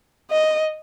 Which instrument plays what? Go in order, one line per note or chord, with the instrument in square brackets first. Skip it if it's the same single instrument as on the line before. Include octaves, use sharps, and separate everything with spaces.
[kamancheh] D#5